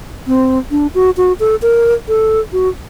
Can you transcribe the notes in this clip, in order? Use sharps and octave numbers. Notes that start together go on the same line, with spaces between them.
C4
D4
F#4
F#4
A4
A#4
A4
F#4